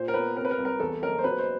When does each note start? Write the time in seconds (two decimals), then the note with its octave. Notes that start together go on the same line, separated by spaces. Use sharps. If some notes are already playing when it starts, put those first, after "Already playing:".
Already playing: A#2 C5
0.08 A#4
0.14 B3 B4
0.37 C3 A#4
0.45 B4
0.51 A#4
0.58 C2
0.65 A#4
0.80 E2 A4
1.02 F#1 A#4
1.18 C5
1.24 B2 B4
1.39 C5